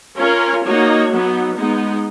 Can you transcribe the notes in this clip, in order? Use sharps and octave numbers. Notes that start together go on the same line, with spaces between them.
C#4 F4 A#4 C#5
A#3 D#4 F#4 C#5
F#3 B3 D#4
G#3 B3 D#4